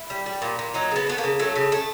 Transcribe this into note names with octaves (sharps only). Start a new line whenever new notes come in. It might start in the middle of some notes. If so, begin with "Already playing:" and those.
Already playing: E4
G3
G3
A#2
A#2
F#3 D#4
C#3 B3
A3 B3
A#3
C#3
F#3 A3
C#3
A3